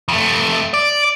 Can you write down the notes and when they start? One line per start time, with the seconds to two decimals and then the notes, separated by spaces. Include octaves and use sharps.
0.08 F2 A3
0.74 D5